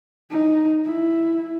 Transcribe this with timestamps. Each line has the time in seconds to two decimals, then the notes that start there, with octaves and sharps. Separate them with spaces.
0.31 D#4
0.85 E4